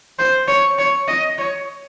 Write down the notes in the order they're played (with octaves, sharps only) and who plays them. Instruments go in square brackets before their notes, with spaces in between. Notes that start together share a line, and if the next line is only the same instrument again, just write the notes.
[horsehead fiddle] C5
C#5
C#5
D#5
C#5